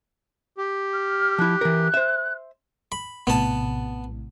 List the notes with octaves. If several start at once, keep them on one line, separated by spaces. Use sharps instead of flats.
G4
F6
F3 E4 F#6
E3 A#4
C5 E5
B5
A#1 A2 C3 B3 A5